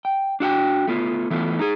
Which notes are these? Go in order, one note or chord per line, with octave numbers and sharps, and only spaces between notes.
G5
D4 F#4 F#5 G5
A3 B3 F4
E3 A3 B3 F4
D#4 G#4